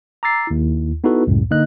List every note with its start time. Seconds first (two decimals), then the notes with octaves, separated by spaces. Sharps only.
0.23 A#5 D6 E6 A6 C7
0.47 D#2 E4
1.04 B3 D#4 E4 F#4 A4 B4
1.27 C#2 F#2 A2
1.51 D3 A#3 D#4 D#5 F#6